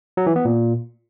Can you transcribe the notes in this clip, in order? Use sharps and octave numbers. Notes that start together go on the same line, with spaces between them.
F#3
E3
B3
A#2